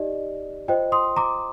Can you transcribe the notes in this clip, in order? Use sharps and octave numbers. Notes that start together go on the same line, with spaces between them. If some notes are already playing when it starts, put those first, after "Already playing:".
Already playing: D#4 G4 D5 D#5
F4 C5 D#5 G5
C6 D#6
A#5 D6